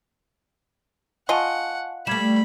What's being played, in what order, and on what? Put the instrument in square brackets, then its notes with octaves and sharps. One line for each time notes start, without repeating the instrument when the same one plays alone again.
[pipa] F4 D#5 [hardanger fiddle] F#5 [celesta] G#5 A5 C#6
[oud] G3 A3 [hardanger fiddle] B5 [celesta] G#6 E7